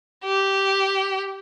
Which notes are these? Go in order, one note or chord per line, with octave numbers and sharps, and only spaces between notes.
G4